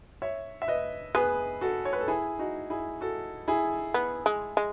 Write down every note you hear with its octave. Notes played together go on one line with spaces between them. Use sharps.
C#5 E5
E5
B4 D#5
B3 G#4 B4
F#4 A4
C#5
B4
A4
E4 G#4
D#4 F#4
E4 G#4
F#4 A4
E4 G#4
B3
G#3
G#3